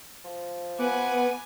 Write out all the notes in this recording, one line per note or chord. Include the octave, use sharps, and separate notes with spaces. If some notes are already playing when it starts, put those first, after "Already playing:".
F3
B3 B4 F#5 G#5 D6